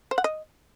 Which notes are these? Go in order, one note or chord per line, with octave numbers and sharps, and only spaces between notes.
C5
F#5
D#5